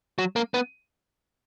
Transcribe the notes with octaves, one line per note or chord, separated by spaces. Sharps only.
F#3
A#3
B3